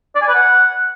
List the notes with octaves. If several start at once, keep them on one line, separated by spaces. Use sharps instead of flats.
D5
G#5
B4
F#5